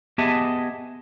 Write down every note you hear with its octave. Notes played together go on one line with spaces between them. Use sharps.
B3 G4 G#4 D#5 E5 A5